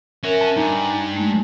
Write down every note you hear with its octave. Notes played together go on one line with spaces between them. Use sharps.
C#4 F#4 A#4 E5
A5
G2 D#4 G#5 D6
G#3 A3